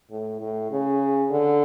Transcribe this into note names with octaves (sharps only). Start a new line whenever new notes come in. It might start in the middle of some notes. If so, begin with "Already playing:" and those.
A2
A2
C#3
D3